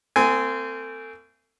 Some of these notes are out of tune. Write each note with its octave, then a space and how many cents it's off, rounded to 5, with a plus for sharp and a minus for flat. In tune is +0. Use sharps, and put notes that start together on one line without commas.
A3 +40 C4 -20 G#5 +0